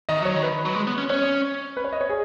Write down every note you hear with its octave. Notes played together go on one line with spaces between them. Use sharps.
D#3 D#5
F#3 C#5
D#3
B4
F#3
G#3
B3
C#4
C#4 C#5
B4
C#5
D#5
C#5
G#4